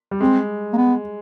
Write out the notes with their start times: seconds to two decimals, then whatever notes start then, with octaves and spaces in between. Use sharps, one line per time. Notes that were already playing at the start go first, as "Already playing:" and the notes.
0.11 G3
0.21 G#3 C4
0.73 A#3
0.77 B3